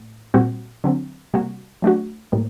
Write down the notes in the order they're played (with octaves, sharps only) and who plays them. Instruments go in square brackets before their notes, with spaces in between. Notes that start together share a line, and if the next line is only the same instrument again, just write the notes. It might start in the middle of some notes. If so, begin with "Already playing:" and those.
Already playing: [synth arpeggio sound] A2
A#2 G3 C4 F#4
D3 F#3 C4
C3 G3 A#3 F#4
F#3 A3 D4 F#4
A2 G3 A#3